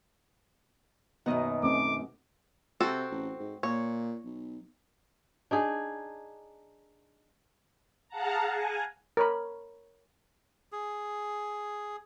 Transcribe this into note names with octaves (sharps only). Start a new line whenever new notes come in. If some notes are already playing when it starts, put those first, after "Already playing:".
F#2 B2 D#3 B3 D#5
A3 C4 C#4 D6
C3 C4 F#4 A4
A1
G#2
A#2 C#5
B1
D4 D#4 G#4
G#4 F5 F#5 A5 A#5
G#5
A#4 C#5 B5
G#4